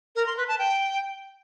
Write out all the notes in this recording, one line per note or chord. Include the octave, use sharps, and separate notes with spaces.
A#4
C6
B4
A5
G5